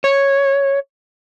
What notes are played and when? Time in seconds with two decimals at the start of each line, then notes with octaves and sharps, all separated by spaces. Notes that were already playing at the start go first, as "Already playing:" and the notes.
0.04 C#5